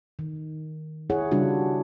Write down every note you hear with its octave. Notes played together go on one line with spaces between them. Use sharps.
D#3
E4 G#4 C#5 F#5
C#3 G3 D4 F4 F#4